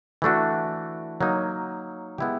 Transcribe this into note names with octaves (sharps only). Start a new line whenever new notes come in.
E3 A3 D4 F#4
F#3 A#3 D#4
G#3 B3 E4 G4